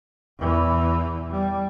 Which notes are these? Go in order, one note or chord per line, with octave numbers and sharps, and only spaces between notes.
E2 E3
G3